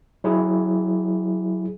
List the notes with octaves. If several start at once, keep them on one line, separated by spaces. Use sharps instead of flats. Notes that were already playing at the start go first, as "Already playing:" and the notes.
F#3 E4 G#4